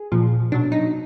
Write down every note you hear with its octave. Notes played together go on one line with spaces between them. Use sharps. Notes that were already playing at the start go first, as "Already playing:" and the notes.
Already playing: G#4
A#2 F3
B2 F#3 D4
D#4